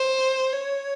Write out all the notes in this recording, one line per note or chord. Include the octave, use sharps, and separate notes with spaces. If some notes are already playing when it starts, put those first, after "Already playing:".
Already playing: C5
C#5